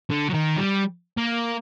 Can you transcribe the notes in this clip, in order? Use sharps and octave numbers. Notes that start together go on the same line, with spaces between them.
D3
F#3
D#3
G3
A#3